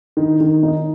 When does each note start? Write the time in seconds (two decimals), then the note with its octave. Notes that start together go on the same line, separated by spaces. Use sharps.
0.17 D#3
0.41 D#3
0.63 D#4